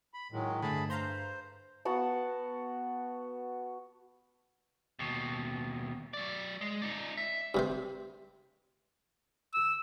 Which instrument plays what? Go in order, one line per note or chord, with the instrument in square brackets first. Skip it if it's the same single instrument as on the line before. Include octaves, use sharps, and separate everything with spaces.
[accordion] B5
[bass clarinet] A2 [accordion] D#3 F#3 G#3
[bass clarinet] G2 [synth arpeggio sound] D3 A3 [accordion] G#4 A5 B5
[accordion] C5 [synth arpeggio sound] F5 A#5 C6
[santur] B3 F#4 F#5 A5
[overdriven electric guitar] D#2 B2
F#3 D5
G#3
D#4 D5
E5
[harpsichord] G2 C3 C5
[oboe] E6